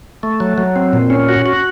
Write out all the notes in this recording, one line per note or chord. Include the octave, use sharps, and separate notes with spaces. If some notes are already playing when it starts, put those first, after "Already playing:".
A3
F#3
F#3
C4
A#2
C#4
F#4
F#4